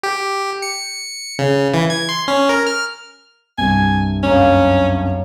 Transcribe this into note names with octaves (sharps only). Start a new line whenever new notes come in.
G4
C#7
C#3
E3
G#6
C6
C#4
A#4
F6
C2 G2 G#5
F#2 A#3 C#4 C#5